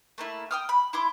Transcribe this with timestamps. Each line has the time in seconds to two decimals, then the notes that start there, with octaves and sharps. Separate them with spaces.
0.18 A3 A#3 E4
0.51 G5 D#6 F6
0.69 B5
0.93 E4 C6 D6